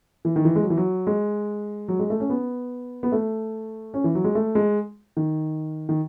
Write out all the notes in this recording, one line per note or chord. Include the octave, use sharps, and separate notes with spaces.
E3
D#3
E3
G#3
F#3
E3
F#3
G#3
F#3
G#3
A3
C#4
B3
B3
A3
C#4
E3
F#3
G#3
A3
G#3
D#3
D#3